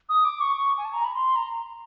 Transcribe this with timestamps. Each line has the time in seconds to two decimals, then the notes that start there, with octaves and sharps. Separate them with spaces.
0.09 D#6
0.25 D6
0.41 C#6
0.56 C#6
0.77 G#5
0.85 A5
0.93 A#5
1.05 B5
1.14 C6
1.36 A#5